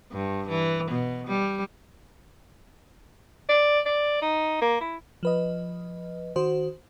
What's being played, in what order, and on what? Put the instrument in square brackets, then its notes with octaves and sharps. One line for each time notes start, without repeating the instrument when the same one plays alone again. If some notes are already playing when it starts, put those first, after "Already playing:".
[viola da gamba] G2
E3
B2
G3
[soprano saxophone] D5
D5
D#4
A#3
E4
[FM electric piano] F3 B4 D#5
D#3 F#4 C5